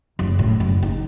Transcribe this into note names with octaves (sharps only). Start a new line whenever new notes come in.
F#1
A2
F#1
D#4